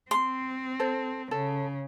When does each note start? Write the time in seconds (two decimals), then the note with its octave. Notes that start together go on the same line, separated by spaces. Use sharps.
0.11 C4 C6
0.80 A4 C5
1.31 C#3 A4